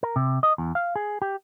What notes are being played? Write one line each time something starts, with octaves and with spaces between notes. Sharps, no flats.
A#4
C3
D#5
E2
F5
G#4
G4